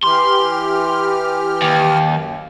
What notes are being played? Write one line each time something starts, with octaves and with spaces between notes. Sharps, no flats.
E3 G4 C6 F6
D#2
F#2